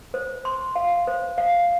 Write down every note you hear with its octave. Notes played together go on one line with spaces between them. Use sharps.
C5
C6
F5
C5
F5